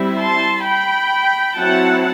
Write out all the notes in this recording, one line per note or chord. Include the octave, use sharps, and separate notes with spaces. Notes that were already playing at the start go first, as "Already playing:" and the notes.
Already playing: G3 C4 E4
A5 C6
G5 B5
F#3 C4 E4 F#5 A5